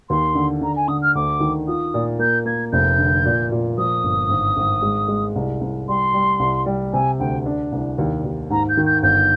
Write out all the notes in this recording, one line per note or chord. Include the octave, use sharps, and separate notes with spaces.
D#2 C6
D3
D3 A#5
G#5
D3 D#6
F6
D2 D6
D#3
F4 D#6
A#2
A#3 G6
A#3 G#6
F1 G6
D3
A#2
A#2
F3 D#6
G1
G#1
G#1
G#3
G#3
C2
C2
G3 C6
G3
C2
G3
C3 G#5
D2 G5
D4
C2
D#2
D#2
G#2 A#5
G6
D#3
G6
G1 G6